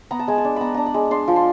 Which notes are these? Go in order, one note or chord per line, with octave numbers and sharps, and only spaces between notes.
B3 A#5
A5
G#3 G#5
A5
D4
B3 A#5 B5
D4 A#5
B5
G#3
D4 C6
F3
C6